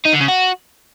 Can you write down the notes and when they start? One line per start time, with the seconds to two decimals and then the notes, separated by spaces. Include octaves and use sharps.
0.05 D#4
0.13 D3
0.20 C#3
0.28 F#4